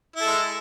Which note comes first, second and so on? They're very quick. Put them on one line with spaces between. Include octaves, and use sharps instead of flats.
E4 A4 G#3